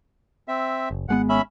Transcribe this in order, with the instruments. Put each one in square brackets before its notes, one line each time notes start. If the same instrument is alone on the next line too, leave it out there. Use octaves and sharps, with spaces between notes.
[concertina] C4 E5
[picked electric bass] F#1
[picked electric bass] G#1 G#3 B3 [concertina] F#5
[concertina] C#4 E5 B5